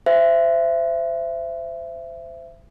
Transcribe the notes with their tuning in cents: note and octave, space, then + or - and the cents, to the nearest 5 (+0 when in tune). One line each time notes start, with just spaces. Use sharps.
C5 -15 E5 +25